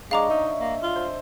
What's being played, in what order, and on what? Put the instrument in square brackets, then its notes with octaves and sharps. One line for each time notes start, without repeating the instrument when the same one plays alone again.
[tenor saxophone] G#3 [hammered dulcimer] D4 C#5 D#5 [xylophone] F5 A#5 D6
[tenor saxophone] D#4 [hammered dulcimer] E5
[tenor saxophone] A#3
F4
[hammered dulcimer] C5